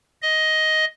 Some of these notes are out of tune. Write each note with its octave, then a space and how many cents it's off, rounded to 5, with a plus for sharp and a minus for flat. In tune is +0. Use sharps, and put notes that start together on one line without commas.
D#5 +10